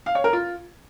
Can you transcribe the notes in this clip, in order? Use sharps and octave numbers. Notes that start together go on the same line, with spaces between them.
F5
C#5
A#4
F4